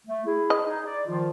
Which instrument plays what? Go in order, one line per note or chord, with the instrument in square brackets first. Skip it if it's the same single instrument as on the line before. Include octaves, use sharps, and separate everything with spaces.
[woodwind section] A3
E4 G#4
[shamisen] D#5
[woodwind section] D#4 G#4
D5
D#3 F3 F4